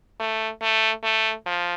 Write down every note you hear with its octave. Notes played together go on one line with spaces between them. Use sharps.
A3
A3
A3
F3